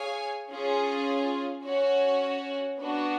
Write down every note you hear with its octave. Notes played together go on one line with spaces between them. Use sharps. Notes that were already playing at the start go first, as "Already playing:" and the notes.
Already playing: G#4 C#5 F5 G#5
C#4 F4 G#4
C#4 F#4 C#5
B3 D4 F#4